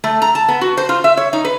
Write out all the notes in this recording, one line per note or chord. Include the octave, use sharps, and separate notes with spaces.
A3
A#5
A5
B3
F#4
C5
F4
E5
C#5
D#4
B4